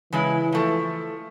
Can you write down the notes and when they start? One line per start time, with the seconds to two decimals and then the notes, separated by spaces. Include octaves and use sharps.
0.13 C#3 E3 G#3 E4
0.52 F3 A3